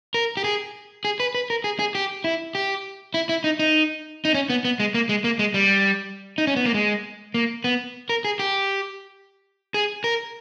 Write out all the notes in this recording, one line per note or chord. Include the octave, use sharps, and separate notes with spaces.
A#4
G4
G#4
G#4
B4
B4
A#4
G#4
G#4
G4
E4
G4
E4
E4
D#4
D#4
D#4
C#4
B3
B3
G#3
A#3
G#3
A#3
G#3
G3
D#4
C#4
B3
A#3
G#3
A#3
B3
A#4
G#4
G4
G#4
A#4